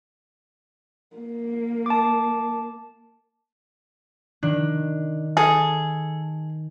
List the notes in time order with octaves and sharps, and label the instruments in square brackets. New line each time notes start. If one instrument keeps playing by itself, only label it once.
[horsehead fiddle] A#3
[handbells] A5 D6
[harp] D#3 [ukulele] D4
[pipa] G#4 [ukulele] A4